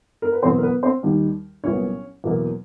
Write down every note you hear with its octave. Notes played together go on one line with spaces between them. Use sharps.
A#4
B4
E2 B2 F#3 B3 C4 C5
A#4
B3 B4
C4 C5
D#2 D#3 G3
C2 A#2 F#3 B3 C#4 C#5
E2 B2 F#3 A#3